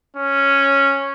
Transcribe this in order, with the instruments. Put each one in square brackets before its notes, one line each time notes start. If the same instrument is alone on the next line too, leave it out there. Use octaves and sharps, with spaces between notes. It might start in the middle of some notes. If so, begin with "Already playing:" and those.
[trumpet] C#4